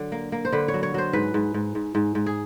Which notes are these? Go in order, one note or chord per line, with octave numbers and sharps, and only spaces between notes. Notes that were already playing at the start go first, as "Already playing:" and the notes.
Already playing: D3 F#3
A#3
A#3
C5
D3 B4
C#5
F#3
C#5
F#3 C5
G#2 B4
G#2
G#2
G#2
G#2
G#2
G#4